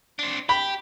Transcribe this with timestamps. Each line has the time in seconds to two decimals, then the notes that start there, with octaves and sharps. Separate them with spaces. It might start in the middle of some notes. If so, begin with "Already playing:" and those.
0.19 C4 D4
0.49 G4 B5